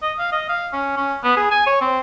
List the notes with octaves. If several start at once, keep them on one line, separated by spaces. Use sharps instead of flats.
D#5
F5
D#5
F5
C#4
C#4
B3
G#4
G#5
C#5
C4